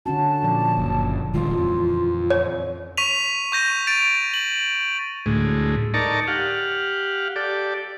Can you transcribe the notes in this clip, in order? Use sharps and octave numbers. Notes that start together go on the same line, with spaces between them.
D3 C#4 F#4 A5
A#2 F3 D5
F#1
D#1 D#3 G#3 F4
F2 E3
C#5
C#6 B6 D#7 F7
C#6 G6 A#6 D#7
A6 D7 F7
F#7
D2 A2 G#3
D#4 A4 A#4 D5 A5 C#6
G4 F5 F#5
G4 A4 D5